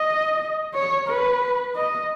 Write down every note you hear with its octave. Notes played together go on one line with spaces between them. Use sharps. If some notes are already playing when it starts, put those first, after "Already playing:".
Already playing: D#5
C#5
B4
D#5